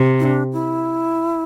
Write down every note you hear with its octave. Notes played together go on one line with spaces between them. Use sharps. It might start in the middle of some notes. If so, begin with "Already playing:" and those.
Already playing: C3
E4
D4
E4